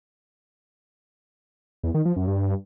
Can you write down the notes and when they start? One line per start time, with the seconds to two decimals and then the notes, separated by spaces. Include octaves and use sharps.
1.83 E2
1.94 D#3
2.05 F3
2.16 F#2
2.27 G2